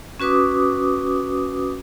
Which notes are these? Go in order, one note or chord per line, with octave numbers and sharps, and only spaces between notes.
C#4 F#4 B4 D6 D#6